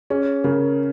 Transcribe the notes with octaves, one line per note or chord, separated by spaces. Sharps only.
C#4 G#4
C#3 A#4